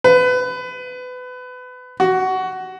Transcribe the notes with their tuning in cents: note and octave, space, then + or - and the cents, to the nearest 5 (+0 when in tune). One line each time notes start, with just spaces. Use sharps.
B4 +25
F#4 +15